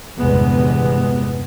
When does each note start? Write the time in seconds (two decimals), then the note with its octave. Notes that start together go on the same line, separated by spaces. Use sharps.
0.19 G1 E2 A2 C3 G#3 B3